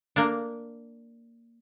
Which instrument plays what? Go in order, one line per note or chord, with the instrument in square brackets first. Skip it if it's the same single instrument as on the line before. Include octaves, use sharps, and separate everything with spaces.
[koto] A#3 D4